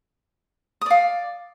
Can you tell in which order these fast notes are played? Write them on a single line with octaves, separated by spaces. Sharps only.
D#6 D5 F5